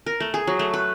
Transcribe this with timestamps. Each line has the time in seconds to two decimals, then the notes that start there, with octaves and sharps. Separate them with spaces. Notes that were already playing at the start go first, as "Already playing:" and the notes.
0.06 A#4
0.20 A3
0.34 G#4
0.47 F#3
0.59 A3
0.74 B4